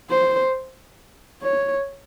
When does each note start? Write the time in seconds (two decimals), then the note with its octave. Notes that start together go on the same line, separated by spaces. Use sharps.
0.10 C5
1.42 C#5